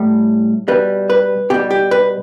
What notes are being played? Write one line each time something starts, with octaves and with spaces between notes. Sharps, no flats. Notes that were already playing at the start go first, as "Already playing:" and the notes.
Already playing: A2 G3
B2 G3 B4
B4
B2 G3 G4
G4
B4